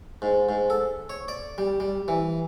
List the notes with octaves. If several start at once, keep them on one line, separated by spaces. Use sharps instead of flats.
G#2
G#2
A4
C#5
D5
G3
G3
E3